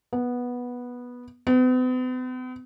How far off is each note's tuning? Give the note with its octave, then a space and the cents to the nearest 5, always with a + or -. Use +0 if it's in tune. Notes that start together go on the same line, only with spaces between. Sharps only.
B3 -10
B3 +45